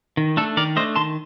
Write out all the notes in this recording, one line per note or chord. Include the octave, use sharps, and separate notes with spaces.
D#3
A3 D4 A4
D#3 A#4 D5
A3 D4 C5 D#5
D#3 A5 C6